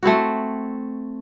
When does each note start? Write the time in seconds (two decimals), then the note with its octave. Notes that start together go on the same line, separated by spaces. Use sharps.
0.03 A3 C4 E4 F#4